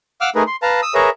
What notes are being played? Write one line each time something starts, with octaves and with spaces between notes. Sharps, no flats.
F5 F#5 D6 E6 F6
A3 D#4 G#4 A#4 B4
C6
B4 F5 A5 A#5
D#6 E6
G#4 A#4 B4 C#5 E5 A#5